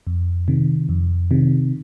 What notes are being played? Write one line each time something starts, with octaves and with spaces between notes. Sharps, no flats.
F2
C3 D#3
F2
C3 D#3